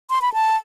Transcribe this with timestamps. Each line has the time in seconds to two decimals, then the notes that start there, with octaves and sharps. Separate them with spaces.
0.10 C6
0.22 B5
0.34 A5